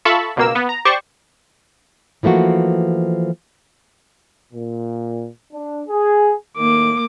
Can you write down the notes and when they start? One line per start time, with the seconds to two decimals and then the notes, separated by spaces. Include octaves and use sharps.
0.05 F4 A4 E5 A5 B5 C#6
0.36 C#2 B2 A#3 E6
0.55 B3
0.69 A#5
0.85 G4 C5 D5 C#6
2.23 E3 F3 A3 A#3 F#4
4.53 A#2
5.53 D4
5.88 G#4
6.58 A2 D#3 A#3 D6